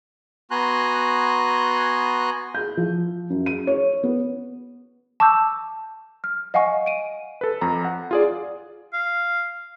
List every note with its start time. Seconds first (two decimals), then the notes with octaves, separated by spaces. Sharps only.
0.51 B3 F#4 G#5 A#5 C6 F#6
2.55 G6
2.77 F3
3.30 F#2
3.46 D#7
3.67 C#5
4.03 B3
5.20 A5 C#6 D6 E6 G6
6.24 F6
6.54 D#5 F5 F#5 G#5 C#6
6.86 D7 D#7
7.41 A4 B4
7.61 F2 A#5
7.85 F#5
8.11 F4 G#4 D5
8.93 F5